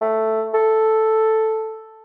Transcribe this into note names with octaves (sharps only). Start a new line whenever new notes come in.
A3
A4